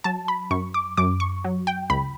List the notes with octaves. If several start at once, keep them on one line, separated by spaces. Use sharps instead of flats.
F#3 A5
B5
F#2 C#6
D6
F#2 D6
C#6
F#3
G5
C#2 B5